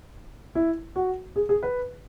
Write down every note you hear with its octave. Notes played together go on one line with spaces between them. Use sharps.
E4
F#4
G#4
G#4
B4